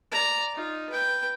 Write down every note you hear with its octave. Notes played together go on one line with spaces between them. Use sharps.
D5 A#5
D#4 F4
B4 G5